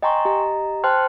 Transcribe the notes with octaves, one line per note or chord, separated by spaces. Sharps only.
D#5 G5 G#5 A#5 C6 C#6
G4 D#5 A#5
C5 G5 A5 C6 F6 F#6